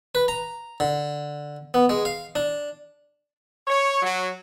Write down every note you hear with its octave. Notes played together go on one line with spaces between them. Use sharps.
B4
A#5
D3
B3
G#3
F5
D4
C#5
F#3